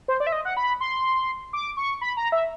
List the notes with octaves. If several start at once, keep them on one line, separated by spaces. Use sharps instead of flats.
C5
D5
E5
D#5
F#5
B5
C6
D6
C#6
B5
A#5
E5